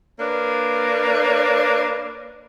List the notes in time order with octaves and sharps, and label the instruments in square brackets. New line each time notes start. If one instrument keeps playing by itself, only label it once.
[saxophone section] A#3 D4 B4 C#5